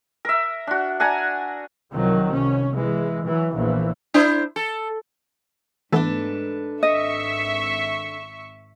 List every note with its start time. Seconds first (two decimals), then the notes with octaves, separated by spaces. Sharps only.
0.25 A#4 E5
0.67 D4 F#4
1.00 D4 F#5 G#5 A#5
1.94 C2 C3 D#3 F3 F#3
2.30 C2 C#4
2.73 E3 G#3
3.25 E3 F#3
3.55 A#1 E2 E3
4.14 D4 E4 C5
4.56 A4
5.92 G#2 E3 A3 B3 D4 A4 B4
6.83 G#1 D#5 E5 C#6